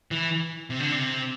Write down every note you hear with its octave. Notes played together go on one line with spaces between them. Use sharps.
E3
C3
D3
C3